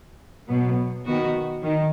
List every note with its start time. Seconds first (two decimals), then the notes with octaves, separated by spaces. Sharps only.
0.48 B2 F#3 B3
1.05 D#3 B3 F#4
1.63 D#3